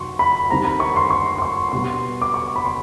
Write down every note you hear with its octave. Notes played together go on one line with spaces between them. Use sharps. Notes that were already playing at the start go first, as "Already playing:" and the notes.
Already playing: C3 D#3 F#3 C6 C#6
B5
D#3 G3 C4 A#5
B5
C#6
C6
C#6
C6
C#6
B2 G3 B3 C6
D6
C#6
B5
C6